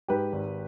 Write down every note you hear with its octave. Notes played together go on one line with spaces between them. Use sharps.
G#2 G4 B4
G#1